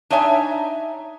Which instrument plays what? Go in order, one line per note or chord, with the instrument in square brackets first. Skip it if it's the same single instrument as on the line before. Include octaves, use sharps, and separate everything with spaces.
[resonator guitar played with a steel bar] D4 D#4 C#5 E5 G#5